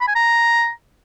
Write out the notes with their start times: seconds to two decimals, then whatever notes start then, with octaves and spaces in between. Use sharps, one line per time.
0.01 B5
0.08 G#5
0.15 A#5